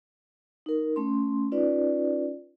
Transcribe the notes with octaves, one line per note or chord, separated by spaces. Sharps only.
D#4 A#4
A3 C#4 C6
C#4 D#4 F4 B4 D5